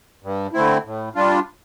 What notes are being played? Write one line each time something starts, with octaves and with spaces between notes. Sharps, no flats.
G2
D3 A3 C4 E4
A2
G3 D4 F4